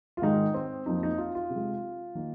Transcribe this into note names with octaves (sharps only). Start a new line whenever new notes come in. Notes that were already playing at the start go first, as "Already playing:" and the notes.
F4
G#2 D#3 G#3 D#4
C4
F2 F3 A#3 D#4
D#4
F4
F4
C3
G#3
D#3 A#3